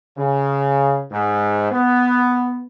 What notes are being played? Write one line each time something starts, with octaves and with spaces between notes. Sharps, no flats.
C#3
G#2
B3